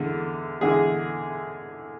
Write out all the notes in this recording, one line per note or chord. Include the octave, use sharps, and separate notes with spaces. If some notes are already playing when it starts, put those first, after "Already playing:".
Already playing: E2 D3 G#3
E2 D3 G#3 G#4